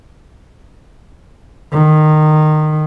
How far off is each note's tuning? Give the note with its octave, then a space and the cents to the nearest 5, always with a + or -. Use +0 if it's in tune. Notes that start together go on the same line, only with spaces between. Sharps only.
D#3 -20